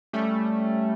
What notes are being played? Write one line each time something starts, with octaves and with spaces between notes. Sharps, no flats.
G3 A3 C#4